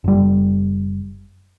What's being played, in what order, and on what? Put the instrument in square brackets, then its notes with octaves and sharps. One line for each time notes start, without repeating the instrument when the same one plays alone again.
[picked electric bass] F#1 G3